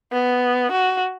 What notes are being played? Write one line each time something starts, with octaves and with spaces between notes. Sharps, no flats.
B3
F#4